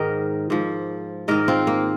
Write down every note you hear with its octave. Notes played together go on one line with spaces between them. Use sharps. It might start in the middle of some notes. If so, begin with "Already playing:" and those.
Already playing: G#2 D#3 A#4 D#5
G#2 F3
G#2 D#3 A#4 D#5
C4 F4
A#3